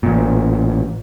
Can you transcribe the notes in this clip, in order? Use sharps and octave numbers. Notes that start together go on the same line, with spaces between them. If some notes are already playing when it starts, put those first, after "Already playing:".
A1 A#2